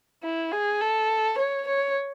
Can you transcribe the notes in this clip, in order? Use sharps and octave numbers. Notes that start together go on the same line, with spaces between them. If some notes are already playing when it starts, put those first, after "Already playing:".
E4
G#4
A4
C#5
C#5